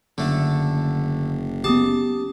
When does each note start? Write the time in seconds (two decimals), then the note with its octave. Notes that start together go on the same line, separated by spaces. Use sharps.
0.18 F#1 D3 A3
1.64 B3 C#4 G4 A5 D#6